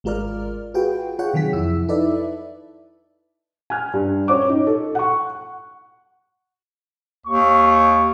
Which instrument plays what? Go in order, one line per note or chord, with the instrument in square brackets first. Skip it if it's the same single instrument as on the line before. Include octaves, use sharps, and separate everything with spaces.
[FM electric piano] G#1 G#3 F4 A#4 D5 F6
F4 F#4 G#4 B4 G5
F4 G#4 C#5 F#5 G5
C3 D#3 F#3 G#4 B6
F2 E4 E6
D#4 E4 A4 B4 D5 E5
[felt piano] G#5 F6
G2
C#4 C#5 D6
D#4
A4
F#5 C#6
[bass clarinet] D#2 [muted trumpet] C#6